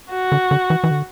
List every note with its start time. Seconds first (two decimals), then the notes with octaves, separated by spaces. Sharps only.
0.12 F#4
0.32 D3
0.51 D3
0.70 E3
0.84 E3
0.91 D3